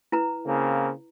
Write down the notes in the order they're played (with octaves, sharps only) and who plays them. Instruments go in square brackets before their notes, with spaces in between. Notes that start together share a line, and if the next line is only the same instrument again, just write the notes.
[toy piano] E4 B4 A#5
[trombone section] C#3 A#3 C4